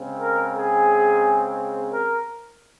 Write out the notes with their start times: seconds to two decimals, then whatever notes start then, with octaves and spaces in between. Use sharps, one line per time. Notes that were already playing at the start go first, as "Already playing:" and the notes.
Already playing: C#3 G#3 C4
0.20 A#4
0.55 G#4
1.92 A#4